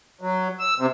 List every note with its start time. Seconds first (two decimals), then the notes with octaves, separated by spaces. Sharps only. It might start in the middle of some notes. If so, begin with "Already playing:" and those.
0.21 F#3
0.59 E6
0.78 C3